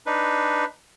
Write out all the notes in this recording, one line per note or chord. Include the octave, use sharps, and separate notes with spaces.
D4 D#4 B4